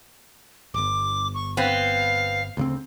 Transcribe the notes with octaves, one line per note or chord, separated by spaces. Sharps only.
D1 G1 D6
C#6
B3 C4 F5
D2 C#3 C4